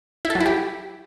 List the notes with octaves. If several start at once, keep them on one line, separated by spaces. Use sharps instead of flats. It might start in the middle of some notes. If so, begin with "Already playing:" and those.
E4
A4
F#3
E4
G4